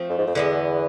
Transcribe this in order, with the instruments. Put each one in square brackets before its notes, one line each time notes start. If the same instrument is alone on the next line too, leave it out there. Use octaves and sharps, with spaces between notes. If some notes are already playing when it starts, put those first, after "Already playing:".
Already playing: [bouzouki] F3 A3 C4
[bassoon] F2
G#2
F2
[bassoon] E2 [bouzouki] D3 G#3 B3